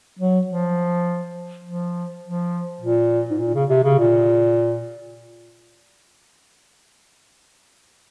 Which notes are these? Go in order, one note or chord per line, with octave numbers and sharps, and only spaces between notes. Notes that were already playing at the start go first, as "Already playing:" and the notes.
F#3
F3
F3
F3
A#2
G#2
A#2
C#3
C3
C#3
A#2